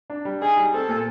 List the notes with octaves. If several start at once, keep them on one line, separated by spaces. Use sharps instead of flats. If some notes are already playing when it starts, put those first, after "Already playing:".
D4
G3
D#4 G#4
G3
C4 A4
A#2